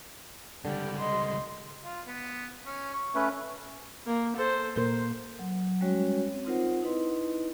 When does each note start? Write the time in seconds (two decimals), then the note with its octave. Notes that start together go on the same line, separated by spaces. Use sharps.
0.65 C#2 D3 G3 G4
0.99 D#5 C6
1.84 F4
2.07 B3
2.66 C#4
2.94 C#6
3.15 A3 C#4 B4
4.07 A#3
4.36 A4 C5
4.76 A#2 A#3 A#4 C5
5.39 F#3
5.81 G3 G#3 C#4 F#4 C#5
6.32 C4
6.45 C4 D#4 F4 A#4 C5 F#5
6.82 D#4 E4 B4 D#5 C6